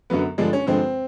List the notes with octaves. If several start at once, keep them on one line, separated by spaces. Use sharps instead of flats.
F#2 D3 F#3 B3
G2 D3 F3 G#3 D4
C#4
G2 D3 F3 G#3 C4